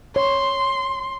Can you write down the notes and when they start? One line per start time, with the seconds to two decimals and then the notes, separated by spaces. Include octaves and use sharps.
0.16 C#5 C6